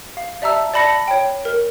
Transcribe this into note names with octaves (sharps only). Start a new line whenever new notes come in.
F5
D5 E5 A5 A#5 E6
D5 A5 B5 A#6 C#7
C#5 G5
A#4